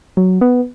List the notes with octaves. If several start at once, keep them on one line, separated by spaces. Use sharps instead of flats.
F#3
B3